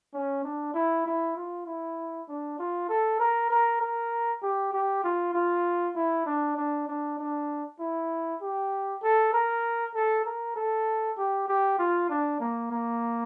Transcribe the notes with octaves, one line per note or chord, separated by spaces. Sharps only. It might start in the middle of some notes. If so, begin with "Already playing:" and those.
C#4
D4
E4
E4
F4
E4
D4
F4
A4
A#4
A#4
A#4
G4
G4
F4
F4
E4
D4
D4
D4
D4
E4
G4
A4
A#4
A4
A#4
A4
G4
G4
F4
D4
A#3
A#3